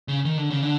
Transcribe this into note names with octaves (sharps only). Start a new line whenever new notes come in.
C#3
D#3
D3
C#3
D3